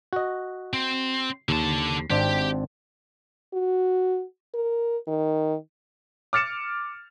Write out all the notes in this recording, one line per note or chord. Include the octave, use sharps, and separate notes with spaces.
F#4 D#5
C4
D#2 D3 A5
G#1 C4 D4 G4
F#4
A#4
D#3
D6 F6 A6 C#7 E7